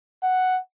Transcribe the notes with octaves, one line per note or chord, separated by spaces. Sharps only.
F#5